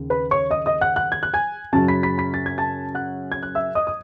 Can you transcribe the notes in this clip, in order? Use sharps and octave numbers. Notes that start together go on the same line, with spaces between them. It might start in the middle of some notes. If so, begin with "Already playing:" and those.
Already playing: D#2 C#3
B4 B5
C#5 C#6
D#5 D#6
D#5 D#6
F#5 F#6
F#5 F#6
G#6
F#6
G#5 G#6
F#2 C#3 F#3 C#4 A5 A6
B5 B6
B5 B6
B5 B6
A6
G#6
A5 A6
F#5 F#6
G#6
F#6
E5 E6
D#5 D#6
D#6